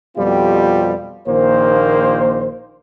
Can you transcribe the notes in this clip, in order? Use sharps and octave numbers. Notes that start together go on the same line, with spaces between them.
F2 B2 G3 C4 F4 G4
A#1 A#2 D#3 A#3 C5